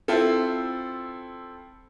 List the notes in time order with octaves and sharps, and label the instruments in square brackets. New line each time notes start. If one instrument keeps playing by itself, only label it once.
[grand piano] C4 E4 F4 A4